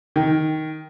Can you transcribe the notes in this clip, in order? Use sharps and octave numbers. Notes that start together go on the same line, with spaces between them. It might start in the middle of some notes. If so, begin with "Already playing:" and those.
D#3